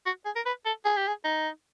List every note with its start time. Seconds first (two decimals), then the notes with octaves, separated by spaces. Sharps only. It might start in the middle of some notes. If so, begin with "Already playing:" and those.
0.06 F#4
0.26 G#4
0.36 A#4
0.46 B4
0.66 A4
0.85 G#4
0.97 G4
1.08 G#4
1.25 D#4